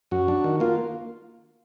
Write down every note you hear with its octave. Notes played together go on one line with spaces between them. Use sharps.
F#2 F#4
D4
D#3
A#3 F4